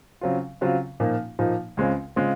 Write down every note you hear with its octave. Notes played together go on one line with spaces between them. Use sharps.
C#3 F#3 C4 F4
C#3 F#3 C4 F4
A#2 F3 A#3 D#4
A#2 F3 A#3 D#4
C#2 C#3 G#3 C4 F4
C#3 G#3 C4 F4